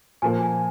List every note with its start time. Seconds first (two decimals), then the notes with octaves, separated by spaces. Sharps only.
0.22 A#2 F3 A#3 G#5
0.43 G#5